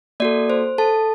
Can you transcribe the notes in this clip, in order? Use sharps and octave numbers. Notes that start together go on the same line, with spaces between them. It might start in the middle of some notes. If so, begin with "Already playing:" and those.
A#3 F#4 A4 D5
C5
A4 A5